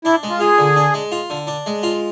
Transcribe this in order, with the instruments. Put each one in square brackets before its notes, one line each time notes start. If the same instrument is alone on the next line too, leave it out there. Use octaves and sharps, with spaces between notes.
[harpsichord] D4 [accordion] E4
[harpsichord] G#3
[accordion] F4
[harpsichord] F4 [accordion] G#4
[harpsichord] D3
D4
G#3
F4
D3
D4
G#3
F4